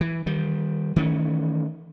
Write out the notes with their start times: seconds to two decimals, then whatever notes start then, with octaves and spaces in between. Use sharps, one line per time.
0.01 E3
0.26 D#3 G3
0.96 D#3 E3 A3 C#4